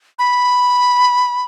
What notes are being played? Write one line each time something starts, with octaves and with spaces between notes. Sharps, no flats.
B5